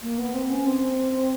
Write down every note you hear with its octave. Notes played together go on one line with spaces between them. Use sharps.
A#3
B3
C4
C#4
C4